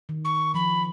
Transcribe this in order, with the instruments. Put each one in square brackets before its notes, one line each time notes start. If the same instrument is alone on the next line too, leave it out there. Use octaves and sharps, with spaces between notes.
[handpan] D#3
[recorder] C#6
[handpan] F3 [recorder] B5